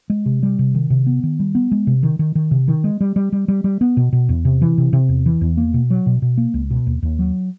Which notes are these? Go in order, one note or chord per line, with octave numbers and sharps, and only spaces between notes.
G#3
C3
G3
C3
D#3
C3
B3
D#3
G3
B3
G#3
C3
D#3
D#3
D#3
C3
D#3
G#3
G3
G3
G3
G3
G3
B3
B2
B2
E2
C3
E3
C3
C3
E2
E3
E2
A#3
B2
F#3
B2
B2
A#3
C#2
B2
D#2
D#2
F#3